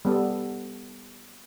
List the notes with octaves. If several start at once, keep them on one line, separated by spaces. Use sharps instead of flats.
G3 B3 A4